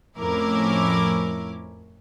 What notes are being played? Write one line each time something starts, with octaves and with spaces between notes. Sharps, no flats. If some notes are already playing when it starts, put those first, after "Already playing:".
F2 A2 C#4 E4 A#4 D6